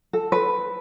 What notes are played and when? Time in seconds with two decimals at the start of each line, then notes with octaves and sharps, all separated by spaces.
0.13 A4
0.32 B4